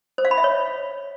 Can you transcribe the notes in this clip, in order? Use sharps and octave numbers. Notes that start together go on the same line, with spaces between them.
C5
F5
B5
E5
C#5